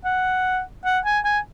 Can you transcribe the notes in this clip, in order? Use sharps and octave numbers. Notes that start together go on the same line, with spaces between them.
F#5
F#5
G#5
G#5